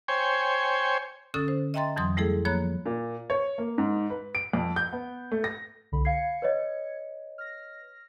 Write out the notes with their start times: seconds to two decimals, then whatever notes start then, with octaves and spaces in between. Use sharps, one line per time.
0.08 C5 C#5 G5 G#5
1.34 D3 C#4 A4 D#6 E6 A6
1.48 C5
1.74 D#5 E5 G5 A#5 C6 A6
1.96 F2 E3 F#3 C6 D#6
2.17 G3 A3 E4 G#4 A4
2.45 F3 A#3 C#5 A#5 B5 F#6
2.86 A#2
3.30 C#5
3.58 A#3
3.78 G#2
4.10 B4
4.35 D7
4.53 F2
4.76 G6
4.93 B3
5.32 A3
5.44 A#6
5.92 C2 D3 B5
6.05 F5 G#6 C7 C#7
6.42 B4 C#5 D#5
7.38 F6 A#6